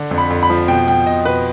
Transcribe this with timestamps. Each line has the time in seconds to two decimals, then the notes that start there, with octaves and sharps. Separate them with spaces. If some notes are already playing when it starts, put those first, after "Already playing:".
Already playing: D3
0.11 F2
0.18 B5
0.30 F2
0.43 B5
0.50 F3
0.68 B2 G5
0.88 B2 G5
1.06 B2 D#5
1.25 B2 B4